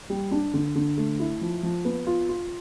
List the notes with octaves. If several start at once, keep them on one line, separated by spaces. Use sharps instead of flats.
G3
D4
D3
D3
A3
E4
F3
F3
B3
F4
F4